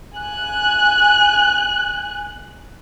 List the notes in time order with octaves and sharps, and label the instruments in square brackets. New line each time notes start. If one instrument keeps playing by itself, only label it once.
[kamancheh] G#5 F#6